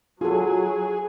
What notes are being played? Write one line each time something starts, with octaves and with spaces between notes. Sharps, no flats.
F#3 F4 G#4 A4